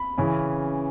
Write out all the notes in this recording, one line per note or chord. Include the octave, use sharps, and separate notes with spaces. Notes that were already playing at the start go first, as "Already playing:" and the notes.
Already playing: B5
C#3 E3 C#4